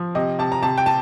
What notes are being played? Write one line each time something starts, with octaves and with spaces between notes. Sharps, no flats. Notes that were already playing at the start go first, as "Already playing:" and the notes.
Already playing: F3
C3 D#5
C3 A5
A#5
C3 A5
G5
A5